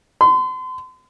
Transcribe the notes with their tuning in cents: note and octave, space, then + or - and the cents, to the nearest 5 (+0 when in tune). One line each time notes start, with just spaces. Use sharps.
C6 -40